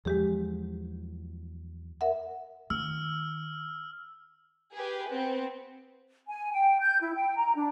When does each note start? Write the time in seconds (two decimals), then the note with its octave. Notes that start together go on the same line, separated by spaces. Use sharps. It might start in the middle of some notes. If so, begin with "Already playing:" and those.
0.05 E2 F3 F#3 G#3 G4 G#4
2.01 A#4 E5 F#5
2.70 D#3 E6 F6
4.73 G4 G#4 B4
5.10 B3 C4
6.28 G#5
6.52 G5
6.80 G6
7.01 E4
7.15 G5
7.36 A#5
7.56 D4